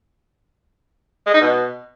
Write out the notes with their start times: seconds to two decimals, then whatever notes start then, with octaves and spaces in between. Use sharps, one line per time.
1.26 G#3
1.34 D#4
1.41 B2